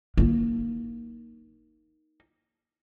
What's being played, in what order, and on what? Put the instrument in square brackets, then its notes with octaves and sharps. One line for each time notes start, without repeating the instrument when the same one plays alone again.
[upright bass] A#3 D#4